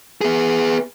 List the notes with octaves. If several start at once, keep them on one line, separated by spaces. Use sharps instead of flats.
B3 G#4